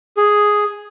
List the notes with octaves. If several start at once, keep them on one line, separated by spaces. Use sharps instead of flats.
G#4